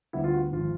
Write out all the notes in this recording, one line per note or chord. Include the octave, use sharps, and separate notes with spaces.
D2 D3 G3 B3 E4
F4
F#4
G#1 F3 F4